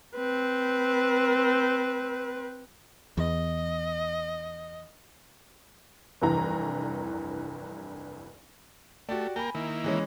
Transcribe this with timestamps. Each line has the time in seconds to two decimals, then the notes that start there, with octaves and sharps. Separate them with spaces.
0.16 C4 B4
3.17 E2 D#5
6.21 F1 C2 G2 E3 A#5
9.09 A3 F#4 G4 D5
9.36 A#3 A#4 G5 G#5 B5
9.55 D#3 A#3 E4
9.84 E3 G#3 C#4